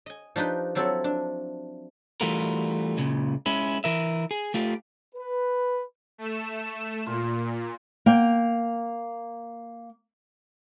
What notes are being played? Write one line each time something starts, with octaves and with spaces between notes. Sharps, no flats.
D#5 G#5
F3 D4 D#4 G4 B4
F3 F#3 C4 E4 A4
D4
E3 G3 A3 F4 F#4 A#4
C#2 A#2 C#3
G#3 C#4 E4
E3 A#4 E5
G#4
A3 F4 G4
B4
A3 E7
A#2 F4
A#3 G5